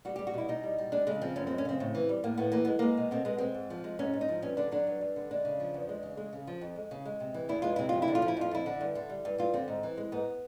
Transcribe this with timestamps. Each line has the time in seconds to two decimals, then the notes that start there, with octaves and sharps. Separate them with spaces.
0.05 G3 F#4
0.16 G3 G4
0.27 F#4
0.34 B2 E4
0.49 B2 D#4
0.63 G3
0.78 G3
0.92 G#3 D4
1.07 C#3 G#3
1.21 F3 C4
1.36 F#2 C#4
1.47 G#3 C4
1.58 C#4
1.65 C#3 C4
1.80 A2
1.95 E3
2.09 G3
2.24 A2 A#3
2.38 A2 B3
2.52 E3 A#3
2.65 G#3 B3
2.79 G#3 A#3
2.97 B2
3.11 B2 C4
3.25 G#3 B3
3.38 G#3 C4
3.55 G#2
3.70 F3
3.84 G#3
3.99 G#2 C#4
4.14 G#2
4.21 D#4
4.29 F3
4.42 G2 C#4
4.57 D3 D4
4.72 F#3 D4
4.87 G2
5.01 G2
5.16 D3
5.31 G#3 D4
5.45 C#3
5.60 F3
5.74 E2
5.89 G#3
6.03 C#3
6.17 G#3
6.33 C#3
6.47 F3
6.61 F2
6.76 G#3
6.91 C#3
7.05 G#3
7.20 C3
7.34 E3
7.49 E2 E4
7.62 G#3 F4
7.76 C3 E4
7.89 F2 F4
8.02 E4
8.08 D3
8.15 F4
8.22 F3
8.28 E4
8.37 F2 F4
8.51 F2 E4
8.66 D3
8.81 G2
8.95 D3
9.09 G3
9.25 G2
9.38 G2 F4
9.53 D3 C4
9.68 G#2
9.83 E3
9.97 G#3
10.12 G#2 B3